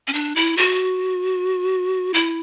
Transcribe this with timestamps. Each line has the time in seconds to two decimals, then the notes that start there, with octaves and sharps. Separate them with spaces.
0.08 C#4
0.13 D4
0.36 E4
0.57 F#4
2.14 E4